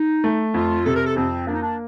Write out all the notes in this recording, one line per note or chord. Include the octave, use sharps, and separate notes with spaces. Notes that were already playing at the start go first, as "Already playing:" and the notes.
Already playing: D#4
A3
F2 F4
C3 A4
A#4
A4
F2 C4
A#3 D4
D#4
D4